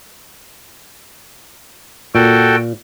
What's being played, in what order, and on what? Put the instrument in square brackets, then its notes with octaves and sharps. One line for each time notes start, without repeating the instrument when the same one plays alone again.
[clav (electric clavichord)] A#2 [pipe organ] F#4 A4 G5